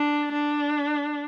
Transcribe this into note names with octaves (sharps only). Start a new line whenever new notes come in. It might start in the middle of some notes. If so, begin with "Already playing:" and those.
Already playing: D4
D4